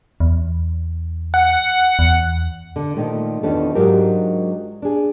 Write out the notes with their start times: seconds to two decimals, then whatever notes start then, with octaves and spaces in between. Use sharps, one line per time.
0.20 E2
1.34 F#5
1.99 E2
2.76 D3
2.96 A#2 D#3 F3 A3
3.43 E2 D#3 F3 C#4 D4 A4
3.75 G#2 F#3 D4 F4 G4 A#4
4.82 D4 G#4